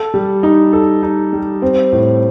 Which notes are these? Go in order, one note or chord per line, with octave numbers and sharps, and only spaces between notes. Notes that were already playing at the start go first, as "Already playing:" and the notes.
Already playing: A4
G3
D#4
A4
D#4
G3
C4
A2